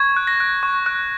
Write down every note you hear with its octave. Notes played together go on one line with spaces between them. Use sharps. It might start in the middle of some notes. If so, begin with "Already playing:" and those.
Already playing: C#6 G#6
F#6
A#6
F#6
C#6
F#6